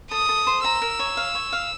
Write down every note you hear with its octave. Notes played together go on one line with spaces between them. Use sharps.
A4 D#6
A4
C5
A#5 E6
A#4
C#5
F5
C#5
F5